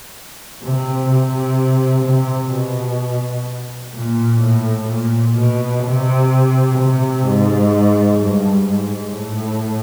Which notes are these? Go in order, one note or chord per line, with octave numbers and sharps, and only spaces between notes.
C3
C3
C3
B2
A#2
A2
A#2
B2
C3
C3
G#2
G2
G#2
A2